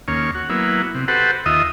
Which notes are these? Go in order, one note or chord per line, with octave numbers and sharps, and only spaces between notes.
D#2 A#3 C#4 C#5
F#4
F#3 A#3 B3 E4
C3
F#4 G4 A4 B4 C5 F#5
D#2 F4 D#5 E5 D#6